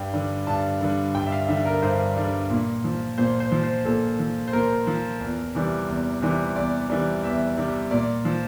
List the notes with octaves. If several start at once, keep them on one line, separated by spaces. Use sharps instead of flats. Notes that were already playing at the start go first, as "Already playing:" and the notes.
Already playing: G2 G5
D3 G3
G2 A5
D3 G3
G2 G5
E5
F5
D3 G3 E5
A#4
G2 C5
D3 G3
A#2
F3
A#2 C5
C5
F3
C5
A#2 A4
F3
C5
A#2 A#4
F3
E2
C3 E3 G3
E2
C3 E3 G3
E2 D5
C3 E3 G3
E2 E5
C3 E3 G3
A#2 D5
F3